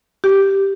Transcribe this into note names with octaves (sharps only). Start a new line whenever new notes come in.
G4